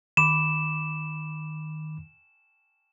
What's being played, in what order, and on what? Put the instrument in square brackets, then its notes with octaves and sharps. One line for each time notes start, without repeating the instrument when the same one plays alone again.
[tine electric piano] D#3 B5 D6 [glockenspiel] E7